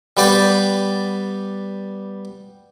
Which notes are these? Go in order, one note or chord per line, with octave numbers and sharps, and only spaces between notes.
G3 B3 B4 D5 G5 D6